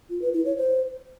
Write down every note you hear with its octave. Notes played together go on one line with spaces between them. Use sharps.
F4
B4
E4
C#5
C5